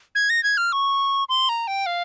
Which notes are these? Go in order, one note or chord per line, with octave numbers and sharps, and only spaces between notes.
G#6
A#6
G#6
F6
C#6
C6
A#5
G5
F5